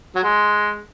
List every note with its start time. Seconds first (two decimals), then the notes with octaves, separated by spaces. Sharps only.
0.15 F#3
0.23 G#3